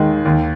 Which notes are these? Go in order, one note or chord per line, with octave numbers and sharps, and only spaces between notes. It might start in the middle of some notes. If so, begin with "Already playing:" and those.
Already playing: D#2 D#3 G#3
D#2